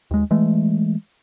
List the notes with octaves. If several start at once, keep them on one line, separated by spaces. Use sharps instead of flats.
D#2 G#3
E3 G#3 A3